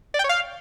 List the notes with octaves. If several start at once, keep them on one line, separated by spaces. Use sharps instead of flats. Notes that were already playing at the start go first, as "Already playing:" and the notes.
D5
G5
C#5
F5